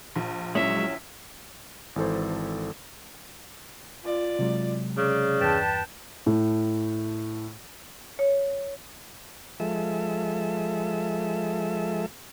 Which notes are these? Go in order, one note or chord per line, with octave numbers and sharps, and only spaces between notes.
A#1
F#3 G#3 C#4 E4 G4 E5
G#1 E3 A4 C5
F4 D5
C3 F#3 G#3
C#3 D5
E2 G2 B4 G5 A5
A2
C#5
F3 G#3 A4 E5